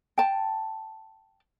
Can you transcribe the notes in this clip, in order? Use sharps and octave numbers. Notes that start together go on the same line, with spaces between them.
G5 A5